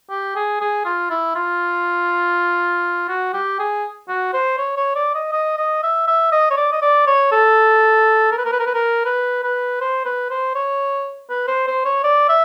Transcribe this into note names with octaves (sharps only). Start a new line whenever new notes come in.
G4
G#4
G#4
F4
E4
F4
F#4
G4
G#4
F#4
C5
C#5
C#5
D5
D#5
D#5
D#5
E5
E5
D#5
C#5
D5
D#5
D5
C#5
A4
A#4
B4
A#4
B4
A#4
B4
A#4
B4
B4
C5
B4
C5
C#5
B4
C5
C5
C#5
D5
E5